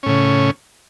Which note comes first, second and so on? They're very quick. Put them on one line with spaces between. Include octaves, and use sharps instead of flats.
C#4 A2 C#3